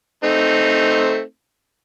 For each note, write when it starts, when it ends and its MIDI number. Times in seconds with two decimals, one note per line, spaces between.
0.24 1.21 57
0.24 1.21 60
0.24 1.21 63